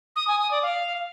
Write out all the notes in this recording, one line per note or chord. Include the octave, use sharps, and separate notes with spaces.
D#6
G#5
D#6
D5
F5